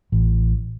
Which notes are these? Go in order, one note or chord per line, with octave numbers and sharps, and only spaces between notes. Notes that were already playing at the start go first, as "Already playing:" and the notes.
A1